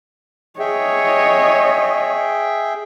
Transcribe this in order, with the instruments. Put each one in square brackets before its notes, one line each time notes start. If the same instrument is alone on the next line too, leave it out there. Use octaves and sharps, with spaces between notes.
[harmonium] G#4 E5 G5 [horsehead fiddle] C#5 D#5